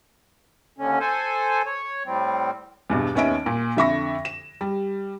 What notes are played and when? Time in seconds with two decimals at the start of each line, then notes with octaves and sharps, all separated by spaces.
0.78 D#2 D3 C#4
1.00 A4 C5 G#5
1.66 C#5
2.06 A2 G3 C4
2.90 E2 G2 B2
3.15 D#2 B3 C#4 D#5 E5 D7
3.46 A#2
3.76 F2 D3 E5 B5 C#6 A#6
4.25 E7
4.61 G3